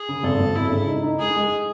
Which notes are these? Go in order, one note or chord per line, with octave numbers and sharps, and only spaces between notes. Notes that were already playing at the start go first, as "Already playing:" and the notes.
Already playing: G#4
C#3
G#1 A4
G#1
G#1 E4
C#3
D#4
D#4
G#3 G#4
G#3